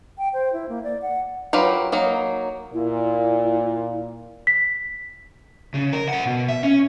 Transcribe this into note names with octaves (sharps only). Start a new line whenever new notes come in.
G5
C5
E4
A#3
D5
F#5
F#3 F4 G4 A#4 B4
F#3 A#3 D#4
A#2 E4
B6
C#3
A#4
A#4 F#5
B2
E5
C#4